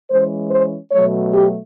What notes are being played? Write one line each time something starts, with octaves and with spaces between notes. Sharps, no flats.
E3 G#3 C#4 C5
C5
B2 F#3 A3 C#5
G4